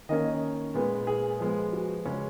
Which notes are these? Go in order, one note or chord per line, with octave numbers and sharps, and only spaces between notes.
D#3 A#3 C#4 D#5
A#2 G#3 B3 B4
G#4
F3 G#3 B3
F#4
C#3 G#3 C#4